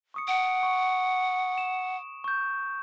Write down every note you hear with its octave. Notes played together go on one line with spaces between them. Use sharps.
C#6 D#6 C#7
F#5 D7
C#6
E7
C#6 G6